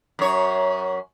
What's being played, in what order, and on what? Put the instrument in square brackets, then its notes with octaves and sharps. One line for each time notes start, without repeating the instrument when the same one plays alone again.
[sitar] F#2 C#5